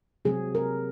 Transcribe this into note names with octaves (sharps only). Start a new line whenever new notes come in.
C3 F#3 C4 G#4
A#4